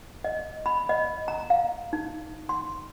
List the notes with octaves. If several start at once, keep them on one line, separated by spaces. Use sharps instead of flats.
D#5
B5
D#5
A#5
F5
D#4
C6